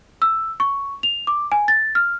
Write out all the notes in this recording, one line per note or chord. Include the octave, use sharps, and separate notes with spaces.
E6
C#6
F7
D6
G#5
A6
F6